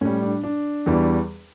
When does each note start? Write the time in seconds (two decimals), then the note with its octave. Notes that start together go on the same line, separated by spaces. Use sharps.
0.01 A2 G3 C#4
0.22 D4
0.43 D4
0.86 E2 E3 G3